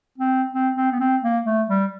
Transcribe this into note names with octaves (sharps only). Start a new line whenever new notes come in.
C4
C4
C4
B3
C4
A#3
A3
G3